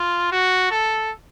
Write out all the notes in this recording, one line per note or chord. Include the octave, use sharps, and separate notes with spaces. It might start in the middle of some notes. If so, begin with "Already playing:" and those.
Already playing: F4
F#4
A4